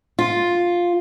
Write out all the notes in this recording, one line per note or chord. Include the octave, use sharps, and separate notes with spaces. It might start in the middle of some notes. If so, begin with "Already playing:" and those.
F4